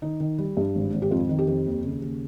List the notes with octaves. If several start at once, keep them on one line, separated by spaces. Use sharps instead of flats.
D#3 D#4
D#3
G3
G2
G#1
G#1
G4
F2 F4
D#3
G4
F2
D#2
C#3
D#2